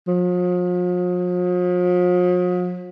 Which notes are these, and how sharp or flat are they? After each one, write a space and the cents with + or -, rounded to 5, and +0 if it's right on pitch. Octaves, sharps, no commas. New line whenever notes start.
F3 +45